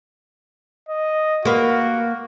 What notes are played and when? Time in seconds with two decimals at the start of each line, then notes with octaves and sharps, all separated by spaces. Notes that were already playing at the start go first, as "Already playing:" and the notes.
0.89 D#5
1.45 A#3 F#4 B4